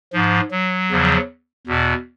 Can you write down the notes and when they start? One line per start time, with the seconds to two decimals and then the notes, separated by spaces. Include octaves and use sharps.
0.13 G#2 F3
0.51 F#3
0.91 E2 C#3 F3
1.67 E2 B2